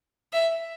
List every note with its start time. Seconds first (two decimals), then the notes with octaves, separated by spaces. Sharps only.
0.33 E5